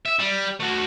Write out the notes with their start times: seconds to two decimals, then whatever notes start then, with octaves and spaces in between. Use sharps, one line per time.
0.05 E5
0.19 G3
0.60 A3 F#4